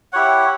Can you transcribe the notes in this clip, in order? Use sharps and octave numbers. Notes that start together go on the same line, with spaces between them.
E4 G4 C#5 F#5